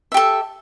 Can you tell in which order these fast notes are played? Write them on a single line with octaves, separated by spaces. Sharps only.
E5 G4 A4